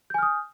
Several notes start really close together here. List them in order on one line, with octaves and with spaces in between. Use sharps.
G6 G#5 F6 D#6